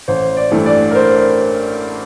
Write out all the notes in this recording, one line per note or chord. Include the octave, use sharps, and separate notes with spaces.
A1 C5
D5
G2 E3 A3
D5
A#4
C5